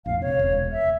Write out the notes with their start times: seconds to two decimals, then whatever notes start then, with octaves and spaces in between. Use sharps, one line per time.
0.06 A#1 F2 A2 F5
0.22 C3 C#5
0.37 E1 C#2
0.72 E5